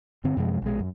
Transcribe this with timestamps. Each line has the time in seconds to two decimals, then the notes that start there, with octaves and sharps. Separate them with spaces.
0.24 G2 D3 C4
0.37 F#2 C3 F3 G#3
0.62 A#1 B2 G#3
0.80 F#2